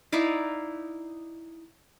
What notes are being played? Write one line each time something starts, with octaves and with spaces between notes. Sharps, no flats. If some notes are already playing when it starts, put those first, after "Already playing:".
D#4 E4 D5 F5